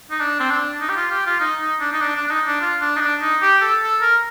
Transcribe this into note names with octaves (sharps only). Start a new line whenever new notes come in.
D#4
D4
C4
D4
D#4
G4
F4
G4
F4
D#4
D#4
D4
D#4
D4
D4
D4
D#4
D4
F4
D4
D#4
D4
D#4
G4
A4
A4
A#4